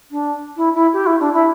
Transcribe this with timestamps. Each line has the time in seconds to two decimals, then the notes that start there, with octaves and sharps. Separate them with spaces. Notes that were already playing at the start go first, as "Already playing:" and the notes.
0.11 D4
0.56 E4
0.74 E4
0.93 G4
1.06 E4
1.20 D4
1.33 E4